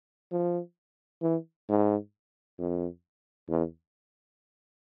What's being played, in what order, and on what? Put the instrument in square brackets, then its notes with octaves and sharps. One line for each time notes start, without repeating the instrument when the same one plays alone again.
[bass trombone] F3
E3
G#2
F2
E2